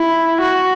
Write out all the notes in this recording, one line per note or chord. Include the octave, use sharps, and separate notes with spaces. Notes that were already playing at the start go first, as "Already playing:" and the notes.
Already playing: E4
F#4